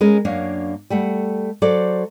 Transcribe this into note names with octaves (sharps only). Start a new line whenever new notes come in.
G#3 C#4 A#4
F#2 A#3 D4 C#5 F5
G3 A3 F#5
F#3 A4 C5 D5